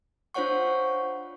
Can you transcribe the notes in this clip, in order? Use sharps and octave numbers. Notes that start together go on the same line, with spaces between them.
D4 F4 C5 C#5 F#5 C#6